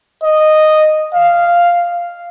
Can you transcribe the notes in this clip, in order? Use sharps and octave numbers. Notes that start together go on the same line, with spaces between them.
D#5
F5